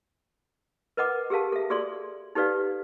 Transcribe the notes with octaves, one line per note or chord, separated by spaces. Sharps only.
A#4 B4 D#5 F#5 D6
G4 G#4 A#4 F5 A5
A4 E5
F#4 G#4 A4 D5 C6
D#4 G4 A4 B4 D5 F5